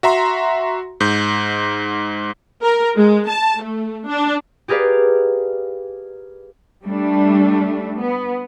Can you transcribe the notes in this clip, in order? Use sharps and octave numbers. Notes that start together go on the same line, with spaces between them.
F#4 E5 A#5 C6
G#2 G6
A#4
G#3
A5
A3
D4
G4 G#4 A#4 B4 D5 F5
G3 A3 D4
B3